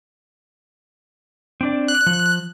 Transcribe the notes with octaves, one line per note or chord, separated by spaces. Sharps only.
C4 D4 D5
F#6
F3